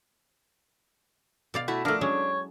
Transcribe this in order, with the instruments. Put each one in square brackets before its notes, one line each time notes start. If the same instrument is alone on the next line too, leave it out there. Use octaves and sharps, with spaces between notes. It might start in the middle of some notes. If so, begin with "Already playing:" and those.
[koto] B2 D5 F5
[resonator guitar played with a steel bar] A3 E4 F#4
[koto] F3 A3 [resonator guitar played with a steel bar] D4 [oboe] A#4
[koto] F#3 G#3 C#4 [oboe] C#5